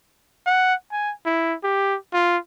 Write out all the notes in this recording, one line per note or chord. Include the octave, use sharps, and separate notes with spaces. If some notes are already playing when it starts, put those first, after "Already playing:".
F#5
G#5
E4
G4
F4